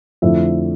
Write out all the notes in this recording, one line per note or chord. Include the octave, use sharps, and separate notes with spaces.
F2 D3 A3 E4 E5